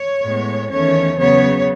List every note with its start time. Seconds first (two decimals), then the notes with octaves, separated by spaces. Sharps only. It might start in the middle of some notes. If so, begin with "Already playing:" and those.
Already playing: C#5
0.23 A2 G#3 B3
0.70 E2 D#3 A3 C#4 C#5
1.18 C#3 F#3 B3 C#5